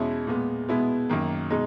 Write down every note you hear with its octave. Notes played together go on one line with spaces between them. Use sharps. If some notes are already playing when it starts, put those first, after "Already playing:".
Already playing: E2 B2 G#3 C#4 E4
A#2 G#3 B3
B2 G#3 B3 E4
F#2 D#3 A#3
B2 G#3 D#4